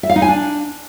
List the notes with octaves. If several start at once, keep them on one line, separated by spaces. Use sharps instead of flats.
E5
F5
D#4
G#5
D4